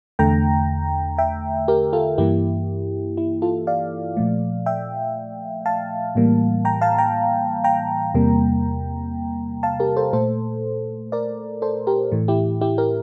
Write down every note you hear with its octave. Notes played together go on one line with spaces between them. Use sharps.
E2 D3 A3 G5 A#5
E5 G5
G4 A#4
F4 A4
G2 E3 A#3 E4 G4
E4
F4 A4
D5 F5
A#2 F3 A3
E5 G5
F5 A5
A2 E3 G3 A#3
G5 A#5
F5 A5
G5 A#5
G5 A#5
E2 C3 G3 A#3
F5 A5
G4 A#4
A4 C5
A#2 A3 A4 C5
A#4 D5
A4 C5
G4 A#4
A2 E3 A3
E4 G4
E4 G4
G4 A#4